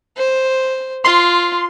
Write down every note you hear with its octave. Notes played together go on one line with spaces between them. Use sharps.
C5
F4 C6